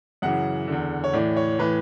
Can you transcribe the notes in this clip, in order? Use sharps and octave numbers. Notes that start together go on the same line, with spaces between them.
F#2 C#3 E3 F#5
E2 D3
C#5
A2 E3 D5
C#5
A2 E3 B4